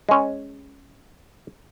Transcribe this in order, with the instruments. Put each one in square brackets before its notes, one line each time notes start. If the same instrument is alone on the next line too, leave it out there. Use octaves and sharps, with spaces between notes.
[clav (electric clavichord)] G#3 C#4